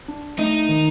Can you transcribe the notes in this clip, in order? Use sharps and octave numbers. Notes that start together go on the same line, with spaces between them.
D4
A3 D#4
D#3